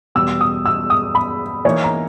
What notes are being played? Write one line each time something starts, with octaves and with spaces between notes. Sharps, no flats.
E2 B2 G3 E6
D#6
E6
D#6
B5
E3 A#3 D#4 C#5
A#5